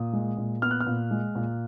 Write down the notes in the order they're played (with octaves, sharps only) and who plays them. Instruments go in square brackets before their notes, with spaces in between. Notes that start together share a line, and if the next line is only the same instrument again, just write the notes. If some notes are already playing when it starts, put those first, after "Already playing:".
Already playing: [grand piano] A#2 D#6
G#3
A#2
B3 F6
F#6
F6
A#2
G#3
A#2